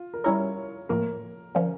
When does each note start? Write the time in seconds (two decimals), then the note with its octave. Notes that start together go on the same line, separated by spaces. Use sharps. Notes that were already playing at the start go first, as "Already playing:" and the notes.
Already playing: F4
0.14 A#4
0.24 G3 C#4 E4 A#4 C#5
0.89 A2 F3 A#3 A#4
1.55 D3 F3 C#4 A#4